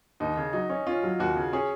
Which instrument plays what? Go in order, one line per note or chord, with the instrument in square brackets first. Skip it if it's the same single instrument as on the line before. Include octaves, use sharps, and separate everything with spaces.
[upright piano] D#2 [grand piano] D#4
[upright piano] C#3
[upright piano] F#3 [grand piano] D#4
[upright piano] C#4 [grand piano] D#4
[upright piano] C#4 [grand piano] F4
[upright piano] F#3
[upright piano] D#2 [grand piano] F#4
[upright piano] C#3
[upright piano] C#4 [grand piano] G#4